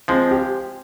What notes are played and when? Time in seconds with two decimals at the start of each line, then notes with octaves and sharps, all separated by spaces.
0.08 F3 G#3 C4
0.31 G4